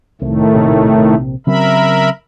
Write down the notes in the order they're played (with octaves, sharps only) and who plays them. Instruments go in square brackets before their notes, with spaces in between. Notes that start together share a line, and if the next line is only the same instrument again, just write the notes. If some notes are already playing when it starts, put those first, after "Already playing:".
[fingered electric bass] C2 [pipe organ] A2 D#3 A3
[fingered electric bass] A#1 C3
[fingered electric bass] C#3 F#3 C4 [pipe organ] A#4 E5 B5